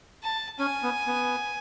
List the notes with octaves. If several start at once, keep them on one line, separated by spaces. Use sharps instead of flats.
A5
C#4 G#5
B3
B3